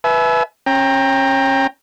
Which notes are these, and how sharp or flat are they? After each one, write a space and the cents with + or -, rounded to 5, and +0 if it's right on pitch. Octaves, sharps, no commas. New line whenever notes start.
B4 +0 E5 +0 G#5 +40
C#4 -25 G5 +15 A#5 +0